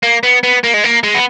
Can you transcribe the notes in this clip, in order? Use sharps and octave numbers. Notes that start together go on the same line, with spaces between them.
A#3
B3
B3
A#3
G#3
A#3
G#3
B3